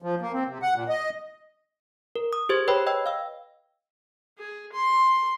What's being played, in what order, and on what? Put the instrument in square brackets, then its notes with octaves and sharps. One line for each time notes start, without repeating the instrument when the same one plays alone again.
[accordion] F3
A#3
C4
C3
F#5
A#2
D#5
[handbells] A#4
D#6
G4 G#4 C5 G#6
B4 C#5 G5 B5
D#5 G5 E6
F5 E6
[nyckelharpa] G#4
C6